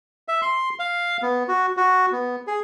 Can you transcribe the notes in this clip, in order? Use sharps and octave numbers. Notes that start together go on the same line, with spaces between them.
E5
C6
F5
B3
F#4
F#4
B3
G#4